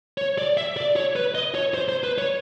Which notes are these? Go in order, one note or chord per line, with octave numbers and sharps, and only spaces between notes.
C#5
D5
E5
D5
C#5
B4
D#5
C#5
C5
C5
B4
C#5